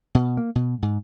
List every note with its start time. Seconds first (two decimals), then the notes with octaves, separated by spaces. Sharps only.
0.15 B2
0.37 A#3
0.55 B2
0.82 G#2